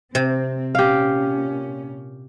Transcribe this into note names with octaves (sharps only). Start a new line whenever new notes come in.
C3 C4
A#2 C#4 G4 F5